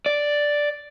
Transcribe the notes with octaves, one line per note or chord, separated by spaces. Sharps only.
D5